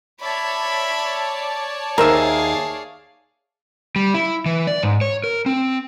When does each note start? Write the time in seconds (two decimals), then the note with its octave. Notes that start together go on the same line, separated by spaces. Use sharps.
0.21 C#5 D5 E5 A5 B5
1.98 D#2 G#4 A#4 C5 E5 F5
3.96 G3
4.14 E4
4.46 E3
4.67 D5
4.83 G#2
5.01 C#5
5.24 A#4
5.46 C4